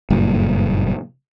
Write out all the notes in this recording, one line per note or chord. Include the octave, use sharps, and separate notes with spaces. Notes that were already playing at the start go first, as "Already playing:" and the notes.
F#1 G2 A#2